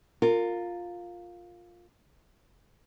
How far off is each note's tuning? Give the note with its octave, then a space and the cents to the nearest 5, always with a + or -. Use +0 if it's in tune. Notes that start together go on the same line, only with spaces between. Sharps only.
F4 +10 A#4 -20